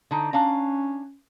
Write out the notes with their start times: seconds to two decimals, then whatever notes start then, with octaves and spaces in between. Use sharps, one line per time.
0.11 D3 D#4
0.33 C#4 D4 F5 A#5